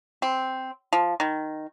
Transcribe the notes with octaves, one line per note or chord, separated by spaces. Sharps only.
C4
F3
D#3